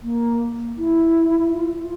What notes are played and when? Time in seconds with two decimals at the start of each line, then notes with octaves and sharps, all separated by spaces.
0.03 A#3
0.78 E4
1.54 F4
1.80 F4